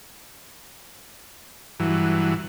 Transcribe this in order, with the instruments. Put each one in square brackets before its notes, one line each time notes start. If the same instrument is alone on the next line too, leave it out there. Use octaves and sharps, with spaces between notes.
[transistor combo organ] G2 E3 F#3